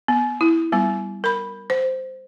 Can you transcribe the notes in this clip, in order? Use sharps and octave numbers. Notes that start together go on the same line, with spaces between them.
B3
E4
G3 B3 F4
A#4 B5
C5